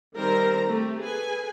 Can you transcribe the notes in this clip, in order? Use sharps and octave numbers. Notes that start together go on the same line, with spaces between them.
D#3 G3 C4 A#4 C5 A#5
A3 G4
G#4 A4 B4 G#5